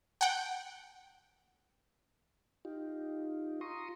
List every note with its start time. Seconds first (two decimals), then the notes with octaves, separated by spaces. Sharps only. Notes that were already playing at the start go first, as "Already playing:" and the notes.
0.21 F#5 G5
2.65 D#4 F4 G4
3.61 F4 A#5 C6 C#6 D#6